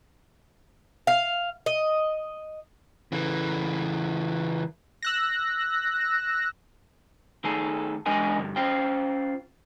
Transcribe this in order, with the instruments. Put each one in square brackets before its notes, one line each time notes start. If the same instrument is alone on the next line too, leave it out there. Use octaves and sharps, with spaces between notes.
[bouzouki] F5
D#5
[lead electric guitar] C#3 E3
[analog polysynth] E6 F#6 A#6
[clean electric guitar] D#3 A3 G#4 A4
E2 G#3 D4 A#4 D#5 G#5
D2 G2
C#4 F4 C5 G5